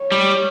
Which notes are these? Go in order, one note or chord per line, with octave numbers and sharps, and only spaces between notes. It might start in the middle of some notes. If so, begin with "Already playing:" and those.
Already playing: C#5
G3